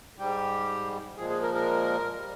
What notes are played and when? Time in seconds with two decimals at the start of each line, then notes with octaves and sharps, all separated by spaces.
0.19 G#2 G3 G4
1.17 A#2 F3 G#3 G#4
1.30 G#4
1.42 A#4
1.54 A#4
2.16 G3